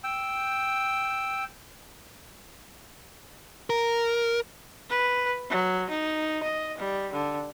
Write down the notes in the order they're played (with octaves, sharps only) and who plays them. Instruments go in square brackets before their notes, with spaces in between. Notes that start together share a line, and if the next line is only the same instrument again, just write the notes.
[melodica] G5 E6
[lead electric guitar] A#4
[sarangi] B4
F#3
D#4
D#5
G3
D3